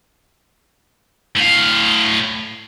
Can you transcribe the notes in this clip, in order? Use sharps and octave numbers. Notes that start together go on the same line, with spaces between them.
A2 F5